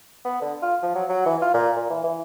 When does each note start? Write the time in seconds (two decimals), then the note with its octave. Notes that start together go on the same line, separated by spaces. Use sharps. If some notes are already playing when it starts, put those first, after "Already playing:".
0.25 B3
0.41 D3
0.62 F4
0.83 F3
0.95 F#3
1.09 F#3
1.26 E3
1.42 F4
1.54 A#2
1.76 A#2
1.90 E3
2.04 E3